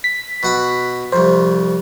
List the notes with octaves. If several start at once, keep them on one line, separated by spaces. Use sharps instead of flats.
B6
B2 F#5 B5
C2 F2 C5